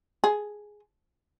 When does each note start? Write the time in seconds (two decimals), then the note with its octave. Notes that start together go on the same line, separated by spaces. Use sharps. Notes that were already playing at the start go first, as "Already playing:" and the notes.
0.24 G#4